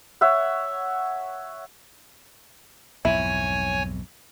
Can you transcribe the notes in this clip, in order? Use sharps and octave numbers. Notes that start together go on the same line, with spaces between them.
C#5 E5 F#5
B1 F2 G#2 E4 C#5 G#5